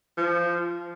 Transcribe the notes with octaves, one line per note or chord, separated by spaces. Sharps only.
F3